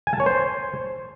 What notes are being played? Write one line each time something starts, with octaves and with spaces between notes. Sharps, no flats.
G#5
A5
C#5
C5